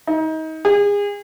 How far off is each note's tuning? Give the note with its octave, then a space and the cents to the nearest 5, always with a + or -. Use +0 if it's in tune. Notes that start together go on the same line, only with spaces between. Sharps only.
D#4 +30
G#4 -30